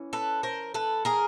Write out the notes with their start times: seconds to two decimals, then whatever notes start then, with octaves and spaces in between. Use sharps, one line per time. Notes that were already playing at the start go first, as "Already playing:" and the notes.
Already playing: E3 C#4
0.13 A4 B4
0.43 A#4 C5
0.74 A4 B4
1.05 G#4 A#4